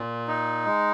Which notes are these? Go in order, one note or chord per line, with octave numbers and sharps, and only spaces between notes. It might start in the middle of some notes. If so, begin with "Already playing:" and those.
Already playing: A#2
D#4
G#3